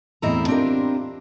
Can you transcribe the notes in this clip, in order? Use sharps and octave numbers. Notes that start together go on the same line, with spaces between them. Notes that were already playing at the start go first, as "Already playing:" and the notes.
E2 A2 C4 E4 D#5 A#5
C4 D4 F4 G4 A#4